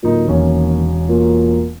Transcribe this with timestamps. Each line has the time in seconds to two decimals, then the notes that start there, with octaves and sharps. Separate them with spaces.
0.03 D1 A#2 D#4
0.27 E1 D#2 C#4
1.08 A#2